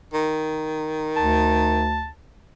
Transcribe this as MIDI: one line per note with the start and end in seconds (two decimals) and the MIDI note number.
0.14 1.87 51
1.17 2.12 38
1.17 2.08 81